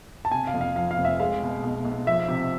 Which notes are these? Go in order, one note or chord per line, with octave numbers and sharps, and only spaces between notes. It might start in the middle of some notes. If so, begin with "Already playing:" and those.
A5
C3 G#5
F5
F2
F5
F3 F5
F5
F1
E5
G#3 F5
B2
B1
B1
F3 E5
C3